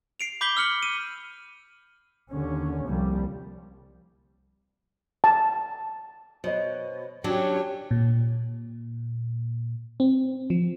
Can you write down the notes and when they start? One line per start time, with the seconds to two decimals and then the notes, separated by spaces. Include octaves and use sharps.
0.20 C7 D7 F7
0.41 B5 D6 G6 B6 G7
0.57 E6 F6 C#7 F#7
0.83 D#7
2.30 D#2 D3 C#4
2.88 C2 F3 G3 A#3
5.24 A5
6.44 B2 C5 C#5 D#5
7.24 F#3 C#4 D4 F#4 G4 C#5
7.91 A#2
10.00 C4
10.50 F3